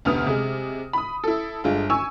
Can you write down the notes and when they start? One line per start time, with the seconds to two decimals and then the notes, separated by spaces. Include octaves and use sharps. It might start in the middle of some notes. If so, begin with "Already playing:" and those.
0.05 F1 D2 B3 D#6 F6
0.26 C3 G#3
0.93 B5 D#6
1.24 E4 A4
1.64 G1 D3 G#3 F4
1.90 G#5 C#6 E6